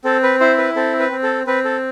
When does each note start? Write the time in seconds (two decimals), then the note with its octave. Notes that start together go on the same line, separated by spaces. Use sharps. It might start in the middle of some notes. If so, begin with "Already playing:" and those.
0.04 C4 A4
0.23 B4
0.40 E4 C5
0.58 B4
0.76 C4 A4
0.99 B4
1.12 C4
1.23 A4
1.47 C4 B4
1.65 A4